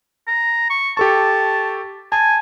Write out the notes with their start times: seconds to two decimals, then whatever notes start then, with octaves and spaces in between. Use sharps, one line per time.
0.28 A#5
0.70 C#6
0.97 G4 A4 A5 C#6
2.12 G#5 A5